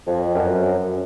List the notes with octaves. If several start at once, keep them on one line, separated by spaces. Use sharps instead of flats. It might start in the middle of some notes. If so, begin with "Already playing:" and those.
F2
F#2
F#2